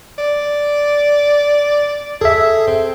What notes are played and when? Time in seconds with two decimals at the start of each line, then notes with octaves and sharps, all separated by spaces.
0.18 D5
2.21 G#4 A4 E5
2.67 C4